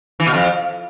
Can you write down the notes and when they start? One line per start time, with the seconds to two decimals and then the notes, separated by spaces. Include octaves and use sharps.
0.20 E3
0.27 B2
0.34 F2